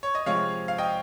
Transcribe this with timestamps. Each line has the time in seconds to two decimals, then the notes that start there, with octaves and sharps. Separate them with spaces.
0.03 C#5
0.15 D#5
0.26 C3 F3 G#3 C#5 F5
0.68 F5
0.78 D#5 G5